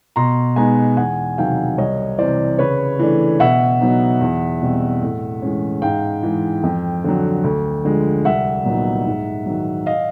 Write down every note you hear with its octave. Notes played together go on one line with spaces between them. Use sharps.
B2 A#5 C6
G#3 B3 D#4 G#5 A#5
E2 F#5 G#5
C3 D#3 F#3 F5 G5
C2 C#5 D#5
C3 E3 C5 D5
C#3 B4 C#5
E3 A3 D4
B2 E5 F#5
F#3 B3 D#4
E2
B2 G3 C4
A2
E3 G#3 C#4
G#2 F5 G5
E3 G#3
F2
D3 F#3
D2
D3 F3 G#3
C2 E5 F#5
A#2 F#3 B3 D#4
G#2
D#3 F#3
D#5 F5